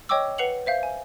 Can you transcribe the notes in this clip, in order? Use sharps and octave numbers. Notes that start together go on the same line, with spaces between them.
C#5 D#5 G5 C#6 D6 E6
B4 F#5 C7 C#7 F7 F#7
C5 E5 F5 G6
G#5